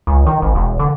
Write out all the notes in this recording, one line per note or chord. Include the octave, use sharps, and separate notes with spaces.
C#2
D#3
G#1
E1
D3